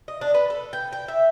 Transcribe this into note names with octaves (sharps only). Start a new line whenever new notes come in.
D#5
D4
B4
A4
G5
G5
E5